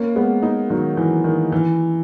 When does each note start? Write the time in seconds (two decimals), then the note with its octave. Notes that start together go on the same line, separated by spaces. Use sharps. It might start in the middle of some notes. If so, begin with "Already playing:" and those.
Already playing: A#3 C#4
0.16 G#3 B3
0.43 B3 D#4
0.70 D#3 F#3
0.97 E3
1.24 D#3
1.52 E3